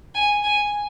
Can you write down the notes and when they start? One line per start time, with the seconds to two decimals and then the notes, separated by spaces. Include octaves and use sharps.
0.15 G#5
0.44 G#5